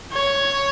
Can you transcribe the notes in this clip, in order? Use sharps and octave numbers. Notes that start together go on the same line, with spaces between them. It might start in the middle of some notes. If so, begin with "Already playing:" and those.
C#5